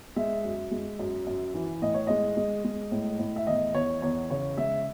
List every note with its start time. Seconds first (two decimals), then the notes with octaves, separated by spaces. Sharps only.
0.16 G#3 E5
0.45 F#2
0.71 G#3
0.99 F#2
1.27 F#2
1.54 E3
1.82 A2 D#5
1.94 C#5
2.07 G#3 D#5
2.37 G#3
2.65 G#3
2.92 A2
3.19 A2
3.36 E5
3.47 E2 D#5
3.75 E2 C#5
4.02 E2 C#5
4.30 C#3 C#5
4.57 G#3 E5